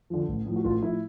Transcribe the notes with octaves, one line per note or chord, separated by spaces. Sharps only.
D3 F3
A1
A2 F3
F#4
A1 F4
A2 F3 E4